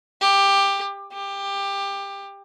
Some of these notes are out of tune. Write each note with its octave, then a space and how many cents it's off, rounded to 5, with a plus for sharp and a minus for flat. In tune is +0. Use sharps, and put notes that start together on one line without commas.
G4 +15
G4 +20